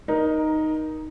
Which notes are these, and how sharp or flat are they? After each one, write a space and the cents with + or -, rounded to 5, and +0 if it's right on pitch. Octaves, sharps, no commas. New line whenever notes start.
D#4 +0 A#4 +20